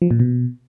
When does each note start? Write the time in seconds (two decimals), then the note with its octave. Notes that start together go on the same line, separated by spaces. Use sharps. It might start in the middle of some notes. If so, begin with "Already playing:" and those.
0.02 F3
0.11 A#2
0.20 B2